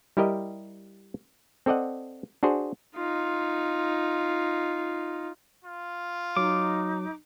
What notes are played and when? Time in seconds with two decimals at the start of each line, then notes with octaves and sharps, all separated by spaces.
0.17 G3 E4 G4 A#4 D#5
1.66 C4 A4 D5 D#5 F#5
2.43 D4 F#4 G#4 C5
2.95 D#4 F4
5.64 F4
6.37 F#3 D#4 D6